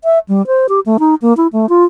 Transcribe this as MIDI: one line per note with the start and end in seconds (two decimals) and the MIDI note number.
0.04 0.19 76
0.28 0.45 55
0.47 0.67 72
0.69 0.80 67
0.86 0.97 57
0.99 1.15 63
1.22 1.35 58
1.37 1.47 64
1.53 1.69 57
1.69 1.84 65